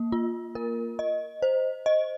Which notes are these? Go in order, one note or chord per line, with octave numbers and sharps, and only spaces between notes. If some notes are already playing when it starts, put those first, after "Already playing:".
Already playing: A#3
F4
A#4
D#5
C5
D#5